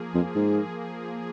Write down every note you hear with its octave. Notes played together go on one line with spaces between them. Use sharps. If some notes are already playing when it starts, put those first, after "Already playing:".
Already playing: F3 A#3 G#4
F2
G#2